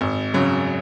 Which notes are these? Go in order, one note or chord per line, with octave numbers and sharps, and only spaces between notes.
G#1
F#2 C#3 F#3